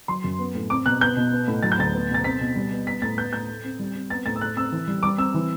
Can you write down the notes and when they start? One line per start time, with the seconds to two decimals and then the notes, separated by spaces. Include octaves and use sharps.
0.08 F#3 C6
0.24 F#2
0.39 B3
0.55 A2
0.70 C4 D6
0.86 B2 F#6
1.01 B3 G6
1.16 B2
1.32 B3
1.48 A2
1.63 F#3 A6
1.72 G6
1.79 D2 A6
1.94 B3
2.10 B2 A6
2.24 C4 B6
2.41 B2
2.56 G3
2.71 B3
2.87 B3 B6
3.02 A2 A6
3.18 B3 G6
3.33 A2 G6
3.48 A3
3.64 C4
3.79 G3
3.95 C4
4.10 B3 A6
4.26 A2 A6
4.36 E6
4.41 A3 F#6
4.56 C4 E6
4.72 E3
4.87 G3
5.03 G3 D6
5.18 C4 E6
5.34 E3